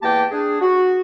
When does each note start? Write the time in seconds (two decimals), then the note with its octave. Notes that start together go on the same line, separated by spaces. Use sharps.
0.03 E2 A#3 G4 G5 A5
0.32 D4 G#4
0.61 F#4